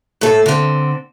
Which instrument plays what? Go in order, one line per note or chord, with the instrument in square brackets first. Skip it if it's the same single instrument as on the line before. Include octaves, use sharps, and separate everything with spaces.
[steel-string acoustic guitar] A2 A4
D3 C4